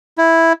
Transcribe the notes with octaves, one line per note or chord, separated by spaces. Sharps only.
E4